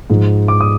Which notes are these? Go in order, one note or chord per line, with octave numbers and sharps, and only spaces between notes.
G#2 F3
D6
D#6